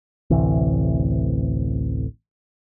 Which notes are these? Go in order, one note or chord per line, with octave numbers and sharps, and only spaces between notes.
A1 D2 C3 E3